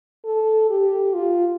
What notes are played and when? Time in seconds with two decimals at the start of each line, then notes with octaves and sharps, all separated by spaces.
0.25 A4
0.70 G4
1.14 F4